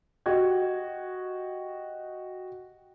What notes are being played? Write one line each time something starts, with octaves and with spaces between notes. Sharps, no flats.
F#4 G4 D#5 G5 G#6